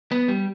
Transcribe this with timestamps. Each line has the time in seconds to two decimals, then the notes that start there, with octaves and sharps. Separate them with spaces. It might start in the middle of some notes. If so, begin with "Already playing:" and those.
0.12 B3
0.28 G3